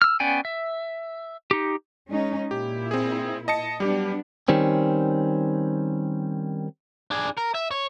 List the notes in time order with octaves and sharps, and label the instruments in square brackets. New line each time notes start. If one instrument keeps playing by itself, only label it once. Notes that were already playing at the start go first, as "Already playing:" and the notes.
[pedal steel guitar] E6 F6
B3 C#4 D5 G5 G#5
E5
D#4 G4
[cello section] G#3 C#4 D#4
[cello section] A#2 E4 [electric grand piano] G4
[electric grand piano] C4 G#4
D#5 A5 C#7
[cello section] F#3 B3 D4 [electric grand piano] G3 G4
[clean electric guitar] D#3 G3 C4 C#4
[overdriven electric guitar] D4 G#4
A#4
E5
C#5